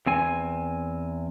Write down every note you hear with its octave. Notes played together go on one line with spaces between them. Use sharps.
E2 C4 G#5